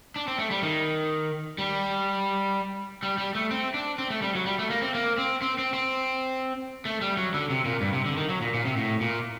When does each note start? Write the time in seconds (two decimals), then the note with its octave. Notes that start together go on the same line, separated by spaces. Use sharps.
0.16 D4
0.28 C4
0.39 A3
0.51 G3
0.63 D#3
1.58 G3
3.03 G3
3.18 G3
3.35 A3
3.51 C4
3.74 D4
3.98 C4
4.10 A3
4.22 G3
4.35 F#3
4.46 G3
4.59 A3
4.70 A#3
4.82 C4
4.95 A#3
5.18 C4
5.42 C4
5.58 C4
5.74 C4
6.85 A3
7.01 G3
7.17 F#3
7.34 D3
7.50 C3
7.65 A#2
7.81 G2
7.93 C3
8.06 D3
8.17 D#3
8.29 F#3
8.41 A#2
8.54 A#2
8.65 C3
8.77 A2
9.01 A#2